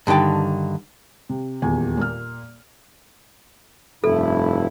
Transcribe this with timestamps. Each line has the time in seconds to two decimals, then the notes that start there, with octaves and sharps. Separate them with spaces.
0.07 G2 D3 D#3 G5 A5
1.29 C3
1.62 D#1 E2 G#5
1.97 A#2 A#3 F6
4.04 F1 G2 E4 A4